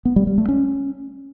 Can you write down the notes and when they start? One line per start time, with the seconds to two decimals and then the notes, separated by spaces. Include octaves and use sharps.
0.05 B3
0.16 G3
0.27 G3
0.38 A3
0.48 C#4